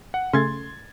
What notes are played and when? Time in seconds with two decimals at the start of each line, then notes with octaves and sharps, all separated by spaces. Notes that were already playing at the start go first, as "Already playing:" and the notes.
0.14 F#5
0.33 C#3 A3 C6 G#6 A6